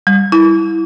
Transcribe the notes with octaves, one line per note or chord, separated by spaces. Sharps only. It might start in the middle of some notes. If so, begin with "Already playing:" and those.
G3
E4